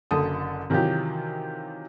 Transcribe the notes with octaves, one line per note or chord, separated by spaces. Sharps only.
F#1 D3 A4 D#6
C3 D#3 E3 F#3 F4 G4